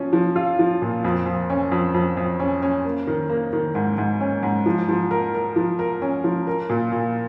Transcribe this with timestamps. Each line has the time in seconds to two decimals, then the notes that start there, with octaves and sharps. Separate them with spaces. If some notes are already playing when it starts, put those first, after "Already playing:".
Already playing: F3 C#4
0.13 F3
0.36 F4
0.59 F3
0.82 A#2
1.04 F2
1.26 F2
1.50 C#4
1.72 F2
1.94 F2
2.17 F2
2.40 C#4
2.62 C#4
2.84 A#3
3.07 D#3
3.30 A#3
3.53 D#3
3.75 G#2
3.98 G#2
4.21 C#4
4.43 G#2
4.66 F3
4.88 F3
5.11 A#4
5.34 A#4
5.56 F3
5.79 A#4
6.02 C#4
6.24 F3
6.47 A#4
6.70 A#2
6.92 A#2